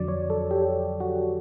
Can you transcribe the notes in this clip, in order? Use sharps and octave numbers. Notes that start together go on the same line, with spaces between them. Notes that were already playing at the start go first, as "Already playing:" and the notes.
Already playing: F2 D3 F#3 D5
C#5
A4
G4
F#4